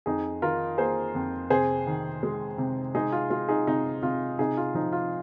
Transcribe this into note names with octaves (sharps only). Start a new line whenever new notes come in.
F2 D#4 G#4
D#3 F4 A#4
A#3 G#4 C5
F2
C3 G#4 C5
D#3
G#3
C3
G#3 D#4 G#4
F4
G#3 F4
D#4 G#4
C3 D#4
C3 F4
C3 D#4 G#4
F4
F3 D#4
F4